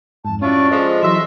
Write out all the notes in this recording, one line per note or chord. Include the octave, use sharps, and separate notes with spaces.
F2 G#2 A5
F#3 C#4 D4 E4 F4 C#6
F3 G#3 A4 D#5
E3 F#3 E5 C6